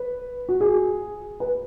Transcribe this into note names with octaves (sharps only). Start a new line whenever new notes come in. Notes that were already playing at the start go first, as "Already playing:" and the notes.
Already playing: B4
F#4
G#4
B4